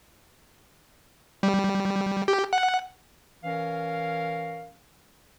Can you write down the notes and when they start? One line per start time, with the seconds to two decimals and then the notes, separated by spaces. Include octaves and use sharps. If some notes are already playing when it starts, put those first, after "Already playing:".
1.43 G3
2.28 G4
2.53 F#5
3.43 E3 C#4 A#4 F5